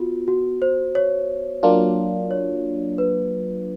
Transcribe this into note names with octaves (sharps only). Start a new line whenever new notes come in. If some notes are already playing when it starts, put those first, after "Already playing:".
Already playing: B3 F4 F#4
F#4
C5
C#5
F#3 A#3 D4 F4
C#5
B4